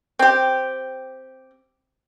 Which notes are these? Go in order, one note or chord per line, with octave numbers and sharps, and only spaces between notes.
C4 G4